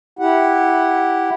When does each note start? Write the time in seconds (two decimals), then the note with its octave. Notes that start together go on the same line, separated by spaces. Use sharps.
0.19 E4 G4 F#5